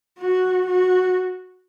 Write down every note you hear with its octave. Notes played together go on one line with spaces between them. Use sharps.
F#4
F#4